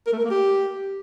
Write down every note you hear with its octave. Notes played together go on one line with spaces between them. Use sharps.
A#4
A3
A#4
A#3
G4